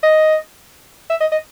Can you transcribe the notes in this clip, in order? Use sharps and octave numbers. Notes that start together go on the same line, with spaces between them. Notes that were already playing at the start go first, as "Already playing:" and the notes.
D#5
E5
D#5
D#5